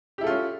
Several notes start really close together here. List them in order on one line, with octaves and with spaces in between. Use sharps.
G4 E4 A4 F4 C#4